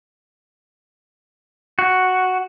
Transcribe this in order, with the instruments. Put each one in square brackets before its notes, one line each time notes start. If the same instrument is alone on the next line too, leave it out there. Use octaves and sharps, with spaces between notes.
[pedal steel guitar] F#4